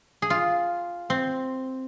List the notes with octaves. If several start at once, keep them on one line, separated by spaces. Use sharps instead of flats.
G#4
F4
C4